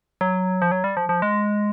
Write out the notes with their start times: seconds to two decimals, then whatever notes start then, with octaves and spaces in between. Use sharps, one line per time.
0.21 F#3
0.62 F3
0.72 F#3
0.84 G3
0.97 F3
1.09 F3
1.22 G#3